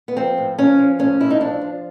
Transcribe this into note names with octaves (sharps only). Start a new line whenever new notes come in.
B3
F3 C4
A2
F3 C#4
F3
A2 C#4
A2 E4
D#4
F3 D4
F3